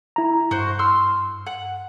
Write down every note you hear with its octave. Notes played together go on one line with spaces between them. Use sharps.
E4 A#5
G2 F#4 C5
C6 E6 F6
F#5